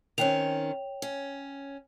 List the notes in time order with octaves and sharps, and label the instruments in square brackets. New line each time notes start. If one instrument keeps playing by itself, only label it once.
[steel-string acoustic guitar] D#3 C4 C#4 [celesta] C#5 G5 F7
[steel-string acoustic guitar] C#4